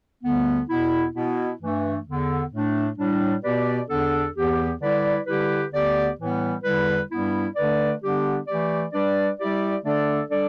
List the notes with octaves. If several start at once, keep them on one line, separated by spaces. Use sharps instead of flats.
D2 D3 G3 B3
E2 B2 B3 E4
B2 B3 E4
G2 E3 A3
E2 D3 B3
A2 A3 D4
A2 G3 D4
B2 B3 G4 B4 D5
E2 D3 B3 D4 A4
E2 E3 B3 G4
D3 G3 E4 B4 D5
D3 G3 E4 G4 B4
D2 D3 B3 G4 D5
A2 E3 G3 B3
E2 D3 G3 E4 B4
G2 G3 B3 E4
D3 A3 D4 B4 D5
D3 G3 B3 D4 G4
E3 A3 G4 D5
G3 D4 B4 D5
G3 E4 G4 D5
D3 A3 D4 A4 D5
G3 D4 A4 D5